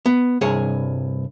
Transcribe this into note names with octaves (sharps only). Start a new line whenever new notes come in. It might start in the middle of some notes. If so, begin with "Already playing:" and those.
B3
C2 G2 G#4 C#5